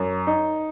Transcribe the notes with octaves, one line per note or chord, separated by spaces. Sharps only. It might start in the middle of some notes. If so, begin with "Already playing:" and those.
Already playing: F#2
D#4